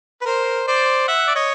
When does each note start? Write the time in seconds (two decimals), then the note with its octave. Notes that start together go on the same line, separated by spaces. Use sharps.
0.21 B4
0.26 A#4 C5
0.67 C5 D5
1.08 E5 F#5
1.27 D5
1.35 C#5 D#5